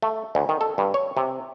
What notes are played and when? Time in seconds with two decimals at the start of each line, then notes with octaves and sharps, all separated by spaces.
0.02 A3
0.35 D2
0.49 D#3
0.61 A4
0.78 G2
0.94 C#5
1.17 C3